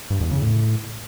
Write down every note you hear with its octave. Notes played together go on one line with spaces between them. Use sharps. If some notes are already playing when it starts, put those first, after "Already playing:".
G2
E2
C#3
A2